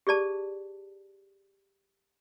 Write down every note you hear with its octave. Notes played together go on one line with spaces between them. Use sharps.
G4 G#4 D5 A5